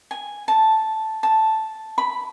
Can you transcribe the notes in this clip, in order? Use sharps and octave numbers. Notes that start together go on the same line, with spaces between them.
G#5
A5
A5
B5